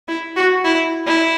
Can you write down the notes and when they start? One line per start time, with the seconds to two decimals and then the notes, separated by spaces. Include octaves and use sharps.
0.08 E4
0.36 F#4
0.64 E4
1.07 E4